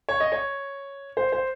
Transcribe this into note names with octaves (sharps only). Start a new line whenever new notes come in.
C#5
D#5
C#5
C5
C5